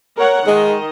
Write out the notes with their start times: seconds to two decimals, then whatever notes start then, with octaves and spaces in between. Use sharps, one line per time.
0.16 A#4 C#5 F#5
0.47 D#3 G#3 D#5